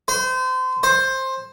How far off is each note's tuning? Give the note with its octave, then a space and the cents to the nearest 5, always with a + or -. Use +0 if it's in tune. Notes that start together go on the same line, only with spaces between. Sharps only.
C5 -30
C5 +15